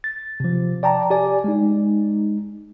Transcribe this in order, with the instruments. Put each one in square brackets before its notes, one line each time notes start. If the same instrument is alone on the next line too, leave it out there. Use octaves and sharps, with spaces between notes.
[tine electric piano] A6
C3 F3
D5 G5 A5 A#5
G4 D5 G#5
G#3 D#4